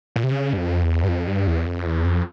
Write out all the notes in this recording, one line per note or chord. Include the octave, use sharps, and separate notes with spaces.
A#2
C3
C#3
G2
F2
E2
G2
F2
G2
E2
F2
E2
F2